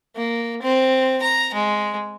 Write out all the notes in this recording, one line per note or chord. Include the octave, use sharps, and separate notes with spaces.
A#3
C4
A#5
G#3